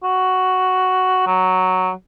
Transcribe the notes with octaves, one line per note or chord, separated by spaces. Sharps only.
F#4
F#3